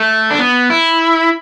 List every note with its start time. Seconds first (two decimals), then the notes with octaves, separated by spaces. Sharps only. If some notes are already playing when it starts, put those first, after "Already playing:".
Already playing: A3
0.31 D4
0.39 B3
0.70 E4